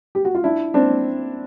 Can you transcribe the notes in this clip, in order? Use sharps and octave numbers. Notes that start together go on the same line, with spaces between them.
G4
F#4
F4
D4 E4
C4 D4